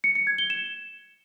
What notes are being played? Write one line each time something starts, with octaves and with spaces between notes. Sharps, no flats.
C#7
C#7
G#6
G7
E7